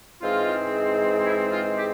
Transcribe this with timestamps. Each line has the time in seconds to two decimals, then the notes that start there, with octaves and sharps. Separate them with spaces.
0.22 G#2 E3 G#3 C4 F4
1.26 E4
1.52 F4
1.77 G4